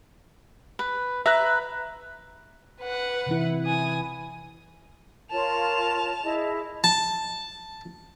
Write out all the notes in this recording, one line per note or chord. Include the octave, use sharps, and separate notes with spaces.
B4
B4 E5 A#5 F#6
B4 F#5
C3 E3 E4
G#5 D#6
F4 A#4 C#5 A5 F7
E4 G#4 D#5
A5